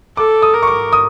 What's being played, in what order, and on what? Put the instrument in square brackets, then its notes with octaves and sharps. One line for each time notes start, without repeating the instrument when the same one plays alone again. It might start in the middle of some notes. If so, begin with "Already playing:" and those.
[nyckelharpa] A4 [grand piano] D6
[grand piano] D#6
[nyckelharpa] A#4
[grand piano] C#6
D6
D#6